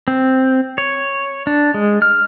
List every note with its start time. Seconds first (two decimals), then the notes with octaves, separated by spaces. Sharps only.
0.08 C4
0.78 C#5
1.47 D4
1.74 G#3
2.02 F6